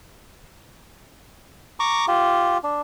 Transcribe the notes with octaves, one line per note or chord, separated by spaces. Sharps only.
A#5 C#6 D6
F4 G4
D4